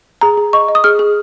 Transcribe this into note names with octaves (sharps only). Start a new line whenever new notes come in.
G#4 A#5
G#4
D#5 C#6
D#5
D#6
G#4 F6
G#4